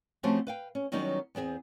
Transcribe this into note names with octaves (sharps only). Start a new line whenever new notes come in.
F3 A3 C4 C#4 F#4 G4
B4 F5 G5
C#4
D#3 F#3 G3 B3 C#4 D#4
E2 B3 C4 G#4